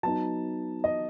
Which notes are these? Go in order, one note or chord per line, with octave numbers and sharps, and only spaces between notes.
F#3 B3 D#4 A5
D#5